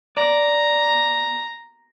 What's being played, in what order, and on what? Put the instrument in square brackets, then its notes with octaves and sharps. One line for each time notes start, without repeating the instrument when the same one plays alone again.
[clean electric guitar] D5 [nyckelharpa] A#5